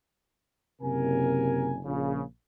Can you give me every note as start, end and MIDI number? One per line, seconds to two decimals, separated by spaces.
0.82 1.78 30
0.82 1.78 48
0.82 1.78 70
0.82 1.78 80
1.85 2.22 34
1.85 2.22 49